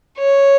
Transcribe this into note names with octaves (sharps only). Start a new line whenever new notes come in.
C#5